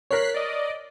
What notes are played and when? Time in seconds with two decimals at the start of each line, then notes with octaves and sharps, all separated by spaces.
0.11 A#4 C#5 F#6 B6 C7
0.34 D5 D#5